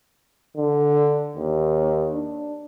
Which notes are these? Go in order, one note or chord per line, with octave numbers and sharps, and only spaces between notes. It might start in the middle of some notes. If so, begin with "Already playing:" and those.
D3
D#2
D4